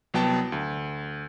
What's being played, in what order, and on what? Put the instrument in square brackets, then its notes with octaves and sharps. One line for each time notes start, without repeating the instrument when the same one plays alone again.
[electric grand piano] C2 F#3 B3 G5 A5
D2